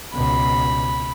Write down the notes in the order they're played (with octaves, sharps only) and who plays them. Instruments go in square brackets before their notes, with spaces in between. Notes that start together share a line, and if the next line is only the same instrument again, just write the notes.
[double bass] C#2 B2 [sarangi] B5